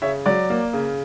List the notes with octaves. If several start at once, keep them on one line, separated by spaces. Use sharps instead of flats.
C#3 C#5 E5
F#3 D5
A#3
C#3